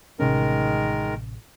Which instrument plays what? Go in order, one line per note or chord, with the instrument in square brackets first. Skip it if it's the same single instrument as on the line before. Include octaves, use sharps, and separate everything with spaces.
[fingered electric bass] A1 C3 C#4 [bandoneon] D#3 G#3 A#4